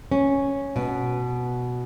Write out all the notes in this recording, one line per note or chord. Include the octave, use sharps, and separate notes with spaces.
C#4
B2